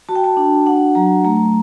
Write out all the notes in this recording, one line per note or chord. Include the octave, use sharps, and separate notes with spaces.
F#4 A5
G5
A5
D4
D4 F#5
F#3 A#5
A3 A#5